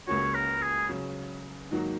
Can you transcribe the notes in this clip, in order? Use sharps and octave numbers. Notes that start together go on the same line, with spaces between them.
C#2 C#3 A#3 C#4 F#4 C#5
A#4
G#4
C#3 F#3 C#4
G#2 D#3 F#3 A#3 F#4